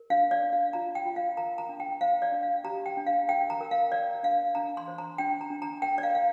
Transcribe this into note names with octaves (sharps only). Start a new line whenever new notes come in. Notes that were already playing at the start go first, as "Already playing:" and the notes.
Already playing: A#4
D4 F5
D5
D4
F5
F4 A#5
G5
F4
F5
A#4 A#5
A#5
D4
G5
C5 F5
D5
D4
F5
G4 A#5
G5
D4
F5
A#4 G5
A#5
A#4
F5
A#4 D5
D4 F5
D4 A#5
C6
C5
A#5
D4 G5
A#5
D4
A#5
A#4 G5
D5
F5
A#4 F5